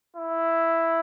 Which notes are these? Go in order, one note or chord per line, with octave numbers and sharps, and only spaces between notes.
E4